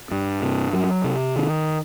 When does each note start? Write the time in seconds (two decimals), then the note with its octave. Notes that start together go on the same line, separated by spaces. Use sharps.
0.11 G2
0.42 C3
0.73 F#3
1.04 C3
1.36 D#3